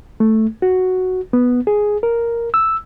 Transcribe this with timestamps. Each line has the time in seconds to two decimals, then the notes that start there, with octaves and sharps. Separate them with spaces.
0.20 A3
0.62 F#4
1.33 B3
1.67 G#4
2.03 A#4
2.54 E6